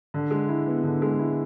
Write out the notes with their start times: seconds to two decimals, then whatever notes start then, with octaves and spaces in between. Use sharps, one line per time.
0.14 D3
0.31 G#3
0.49 E4
0.67 B3
0.84 D3
1.02 G#3
1.19 E4